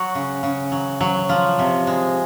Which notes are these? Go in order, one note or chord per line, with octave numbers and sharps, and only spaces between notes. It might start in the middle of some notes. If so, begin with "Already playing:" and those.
Already playing: F#3 F#4
C#3
C#3
F#3
F#3
F3
C3
G#3